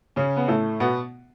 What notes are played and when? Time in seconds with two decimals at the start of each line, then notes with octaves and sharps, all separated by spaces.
0.16 C#3 C#4
0.37 B3
0.48 A2 A3
0.80 B2 B3